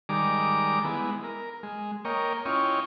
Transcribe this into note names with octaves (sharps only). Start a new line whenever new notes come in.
D#3 G3 G#3 D5 A#5 D6
G#3 B3 E4
A#4
G#3
A#3 A#4 C#5 D#5 G5
C#4 E4 F4 C#5 D#5 G5